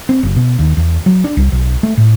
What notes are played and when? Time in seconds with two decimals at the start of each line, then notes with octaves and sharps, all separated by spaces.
0.09 C4
0.23 F#1
0.36 B2
0.59 D#2
0.77 E2
1.06 F#3
1.24 D4
1.37 C2
1.52 B1
1.83 A3
1.97 A2